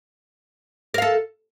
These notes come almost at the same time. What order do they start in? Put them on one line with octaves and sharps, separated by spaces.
A#4 F5 A4